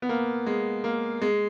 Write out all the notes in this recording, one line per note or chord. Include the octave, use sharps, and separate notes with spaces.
B3
A#3
G#3
A#3
G#3